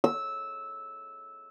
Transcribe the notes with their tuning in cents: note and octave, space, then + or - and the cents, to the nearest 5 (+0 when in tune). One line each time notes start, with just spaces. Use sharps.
E6 -10